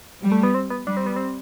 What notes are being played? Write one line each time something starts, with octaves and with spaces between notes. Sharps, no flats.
G3
A3
B3
C4
B3
G3 D4
C4
B3
C4